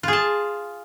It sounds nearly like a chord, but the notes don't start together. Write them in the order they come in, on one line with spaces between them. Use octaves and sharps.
F4 G#4 A5